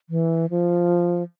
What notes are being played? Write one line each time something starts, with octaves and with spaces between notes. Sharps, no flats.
E3
F3